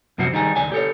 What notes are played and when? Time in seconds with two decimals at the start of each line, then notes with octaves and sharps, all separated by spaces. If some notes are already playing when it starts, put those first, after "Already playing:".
0.18 F#2 C3 F3 C4 F#4
0.32 D#3 G3 D#4 G#4
0.56 C#2 D#3 D5 G#5
0.72 G4 A4 C#5